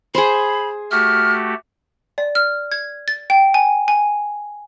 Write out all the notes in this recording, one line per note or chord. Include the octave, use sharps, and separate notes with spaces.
G#4 C5 B5
A3 F#4 G4 F6
D5
F6
G#6
A6
G5
G#5
G#5